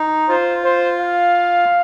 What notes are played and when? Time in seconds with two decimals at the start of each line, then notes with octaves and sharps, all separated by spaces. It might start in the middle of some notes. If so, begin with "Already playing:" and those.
Already playing: D#4
0.29 F4 C5
0.64 C5
1.01 F5